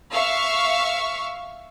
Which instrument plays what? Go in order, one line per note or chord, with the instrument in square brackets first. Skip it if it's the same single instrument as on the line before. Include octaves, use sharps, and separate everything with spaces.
[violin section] E5 F5 C#6